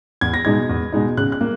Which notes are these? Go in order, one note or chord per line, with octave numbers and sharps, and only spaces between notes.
E2 G#6
A#6
B2 G#3 D#4 G#6
E2
B2 G#3 D#4
C#3 F#6
F#6
A#3